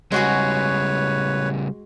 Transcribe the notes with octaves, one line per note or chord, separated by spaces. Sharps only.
C#3 G3 G#3 F#4 G#4 B4 C#5